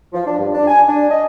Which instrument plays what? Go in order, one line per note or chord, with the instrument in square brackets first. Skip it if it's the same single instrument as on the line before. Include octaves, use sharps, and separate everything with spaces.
[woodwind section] F3
D4
G2
D4
G#5
D4
D#5